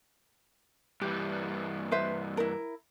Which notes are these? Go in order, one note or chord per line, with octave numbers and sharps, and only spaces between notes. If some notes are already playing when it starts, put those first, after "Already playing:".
G2 E3 G4
B4 C5 E5
E4 A#4